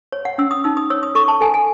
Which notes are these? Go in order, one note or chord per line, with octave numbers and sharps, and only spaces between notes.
C#5
F#5
C#4 E6
D#6
D#4 E6
D#6
C#5 E6
D#6
A4 C#6
A5
A4 G#5
G#5